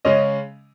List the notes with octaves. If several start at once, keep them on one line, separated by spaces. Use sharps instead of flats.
C#3 G#3 C#4 D#5